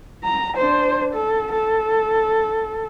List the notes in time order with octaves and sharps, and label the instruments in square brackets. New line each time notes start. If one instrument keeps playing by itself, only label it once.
[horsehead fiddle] A#5
D4 C5
A4
A4